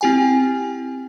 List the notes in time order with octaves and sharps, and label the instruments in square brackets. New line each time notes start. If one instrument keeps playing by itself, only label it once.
[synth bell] C4 E4 G4 G5 G#5